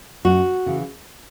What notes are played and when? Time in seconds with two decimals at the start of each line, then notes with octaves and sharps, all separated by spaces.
0.25 F#2 F#4
0.66 C#3 E3